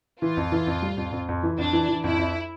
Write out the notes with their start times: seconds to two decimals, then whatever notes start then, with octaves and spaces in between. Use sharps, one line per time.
0.21 E3 F4
0.37 F2
0.52 E3
0.67 F2
0.82 G3
0.97 F2
1.12 F2
1.29 F2
1.43 E3
1.58 F2 D4
1.73 E3
1.89 E3
2.04 F2 E4
2.18 F2